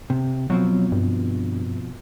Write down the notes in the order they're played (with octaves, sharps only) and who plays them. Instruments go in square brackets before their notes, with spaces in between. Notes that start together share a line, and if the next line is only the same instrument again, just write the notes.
[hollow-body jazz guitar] C3
[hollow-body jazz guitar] B2 F3 C4 [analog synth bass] F#3
[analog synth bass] G2